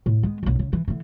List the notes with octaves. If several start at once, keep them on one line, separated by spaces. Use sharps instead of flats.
A2
G#3 B3
F#1 B1
C#3
E3
D3 E3